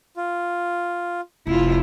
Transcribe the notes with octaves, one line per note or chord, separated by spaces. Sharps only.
F4
F1 E4 F4